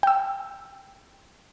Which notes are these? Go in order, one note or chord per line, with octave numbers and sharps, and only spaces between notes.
G5 E6